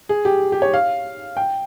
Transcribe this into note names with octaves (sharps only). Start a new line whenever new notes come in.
G#4
G4
G4
C#5
F5
G5